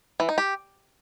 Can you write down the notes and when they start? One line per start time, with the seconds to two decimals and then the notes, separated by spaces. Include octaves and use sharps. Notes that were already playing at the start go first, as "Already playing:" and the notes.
0.20 E3
0.29 D#4
0.38 G4